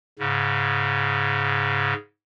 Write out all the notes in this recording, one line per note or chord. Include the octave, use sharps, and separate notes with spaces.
G#2 C#3